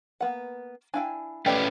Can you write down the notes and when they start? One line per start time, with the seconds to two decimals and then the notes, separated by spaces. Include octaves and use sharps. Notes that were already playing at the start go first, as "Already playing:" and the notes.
0.21 A#3 B3 F#5
0.94 D4 E4 F5 G5 G#5
1.46 A3 C#4 G4 B4 D5 D#5 G5